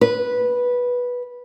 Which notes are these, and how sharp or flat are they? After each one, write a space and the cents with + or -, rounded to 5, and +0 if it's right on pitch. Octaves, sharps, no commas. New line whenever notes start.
B4 -10